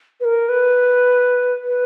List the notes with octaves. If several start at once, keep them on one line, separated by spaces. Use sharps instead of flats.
B4
A#4
B4
B4